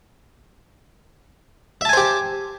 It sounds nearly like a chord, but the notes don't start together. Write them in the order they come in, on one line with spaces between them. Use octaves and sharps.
E5 A5 G#5 C5 G4